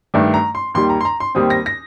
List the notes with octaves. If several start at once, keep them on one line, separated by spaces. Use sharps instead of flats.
G2 D#3 A3 D4
A#5
C6
D#2 D#3 G3 C6
A#5
C6
A#5
C6
D#2 D#3 G3 C4 D#6
A#6
A#6